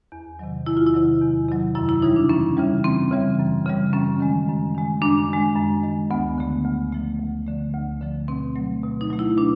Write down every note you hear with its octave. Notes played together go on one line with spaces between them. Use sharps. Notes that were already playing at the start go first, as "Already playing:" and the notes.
E2
C3 D#3 F#3
E2 E4
F4
E4
C3 D#3 F#3
E2
C3 D#3 F#3
F#2 E4
E4
C#3 E3 G3 D#4
D4
F#2 C#4
C#3 E3 G3
F#2 C4
C#3 E3 G3
F#2
C#3 E3 G3
F#2 C#4
D#3 G#3
F#2
D#3 G#3
F#2 D4
D#3 G#3
F#2
D#3 G#3
D2 B3
D3 F3 A3
D2
D3 F3 A3
D2
D3 F3 A3
D2
D3 F3 A3
B2 C4
F#3 A3
B2
D#4
F#3 A3
E4
B2 D4